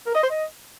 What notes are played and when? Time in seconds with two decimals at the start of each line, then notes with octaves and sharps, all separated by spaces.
0.06 A#4
0.14 D#5
0.22 C5
0.30 D#5